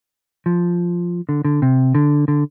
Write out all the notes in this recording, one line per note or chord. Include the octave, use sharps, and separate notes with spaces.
F3
D3
D3
C3
D3
D3